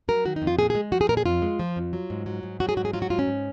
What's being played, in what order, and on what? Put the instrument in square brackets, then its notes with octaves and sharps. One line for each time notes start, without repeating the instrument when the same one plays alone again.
[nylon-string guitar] F#3 A#4
D#3 F#4
D#4
F2
F4
A#2 G#4
G#3 G#4
F3 F#4
G#4
A#2 A#4
G#4
F2 F4
G#3
F3
F2
F#3
G#2
F#3
G#2
F#3 F#4
G#4
G#2 F#4
G#4
F#3 F4
F#4
G#2 F4
C#4
G#2